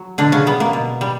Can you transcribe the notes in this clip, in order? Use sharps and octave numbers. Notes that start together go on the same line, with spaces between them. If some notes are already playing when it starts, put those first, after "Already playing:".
Already playing: F#3
B2 D3 D4
C#3 C#4
G3 B3
A#3
B2
G3